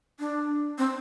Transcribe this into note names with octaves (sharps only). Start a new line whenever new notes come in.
D4
C4